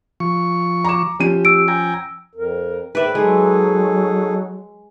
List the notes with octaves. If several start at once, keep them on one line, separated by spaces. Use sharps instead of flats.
F3 C#6
A#5 D6 E7
F3 C#4 G4 D#7
E6 D7
G5 G#5 A#5
F2 A#4
G#2 D#3 B4 D5 E5
F#3 G#3 D#4 G#4 A4